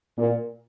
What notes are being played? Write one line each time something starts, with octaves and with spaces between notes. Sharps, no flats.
A#2